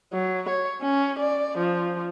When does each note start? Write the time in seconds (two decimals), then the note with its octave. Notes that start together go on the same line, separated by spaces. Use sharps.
0.13 F#3
0.49 C#5
0.81 C#4
1.19 D5
1.58 F3